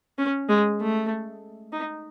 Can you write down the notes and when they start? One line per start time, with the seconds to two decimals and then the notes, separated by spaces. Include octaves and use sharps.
0.18 C#4
0.49 G#3
0.81 A3
1.72 D#4